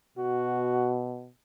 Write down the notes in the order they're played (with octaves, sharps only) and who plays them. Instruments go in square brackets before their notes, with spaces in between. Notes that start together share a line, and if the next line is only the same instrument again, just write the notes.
[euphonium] B2 [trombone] F#4